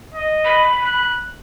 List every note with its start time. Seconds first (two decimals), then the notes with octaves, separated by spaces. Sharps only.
0.15 D#5
0.45 B5
0.82 F#6